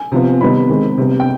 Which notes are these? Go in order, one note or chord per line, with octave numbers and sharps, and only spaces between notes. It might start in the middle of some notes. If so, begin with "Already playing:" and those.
Already playing: G#5
C3 F3 B3
C3 D#3 G3 B3 B5
D#3 G#3 C4
C3 G3 B3
G5